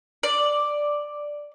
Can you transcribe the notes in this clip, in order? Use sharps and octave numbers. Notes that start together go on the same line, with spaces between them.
D5